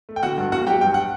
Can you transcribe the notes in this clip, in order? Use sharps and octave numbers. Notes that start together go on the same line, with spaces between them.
A3
G5
D3 F#4 F#5
G2
A#3 F#4 F#5
F#3 G4 G5
G2 G5
F#5